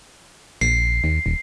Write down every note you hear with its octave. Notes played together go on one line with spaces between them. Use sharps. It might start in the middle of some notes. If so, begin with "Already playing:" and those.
A#1 C7
D#2
D#1